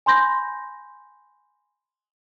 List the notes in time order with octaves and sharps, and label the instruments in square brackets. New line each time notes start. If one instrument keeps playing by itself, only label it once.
[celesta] G#5 B5 C6 G6 A#6